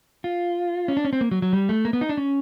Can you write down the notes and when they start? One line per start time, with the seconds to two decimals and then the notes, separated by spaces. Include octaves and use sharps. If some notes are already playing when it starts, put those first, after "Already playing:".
0.24 F4
0.88 C#4
0.97 D4
1.05 C#4
1.13 C4
1.21 A#3
1.31 F#3
1.42 F#3
1.53 G3
1.69 A3
1.85 A#3
1.93 B3
2.01 D#4
2.09 D4
2.17 C#4